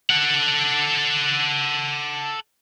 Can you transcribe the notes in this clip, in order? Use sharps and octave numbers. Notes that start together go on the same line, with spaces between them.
A4 F#5